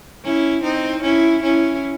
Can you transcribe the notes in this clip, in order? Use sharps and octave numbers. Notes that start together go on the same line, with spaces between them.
C#4 E4
C4 D#4
C#4 E4
C#4 E4